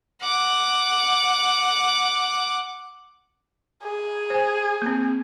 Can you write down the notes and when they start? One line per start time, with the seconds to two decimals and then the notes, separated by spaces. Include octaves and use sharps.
0.22 F#5 D6
3.83 G#4
4.30 C5 G#5
4.82 A#3 C4